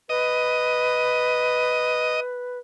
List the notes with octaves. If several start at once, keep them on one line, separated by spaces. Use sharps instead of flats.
B4 D#5